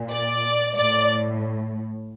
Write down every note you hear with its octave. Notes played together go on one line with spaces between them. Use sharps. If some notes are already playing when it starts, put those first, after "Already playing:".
Already playing: A#2
D5
A2 D5